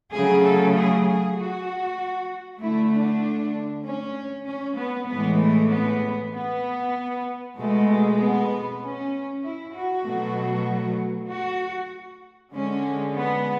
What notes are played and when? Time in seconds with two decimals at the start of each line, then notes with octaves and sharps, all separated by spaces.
0.12 C#3 F#3 A3 G#4
0.44 A4
0.75 G#4
1.06 G#4
1.36 F#4
2.60 D3 A3 E4
2.91 D4
3.84 C#4
4.46 C#4
4.78 B3
5.09 A2 E3 G#3 B3
5.39 A3
5.71 B3
6.33 B3
7.57 B2 G#3 A3
8.19 B3
8.80 C#4
9.43 E4
9.74 F#4
10.05 B2 F#3 A3
11.29 F#4
12.53 D3 G#3 C#4
13.15 B3